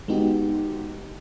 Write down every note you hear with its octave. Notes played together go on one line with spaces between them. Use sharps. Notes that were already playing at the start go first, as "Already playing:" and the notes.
G#3 B3 D#4 F#4 G4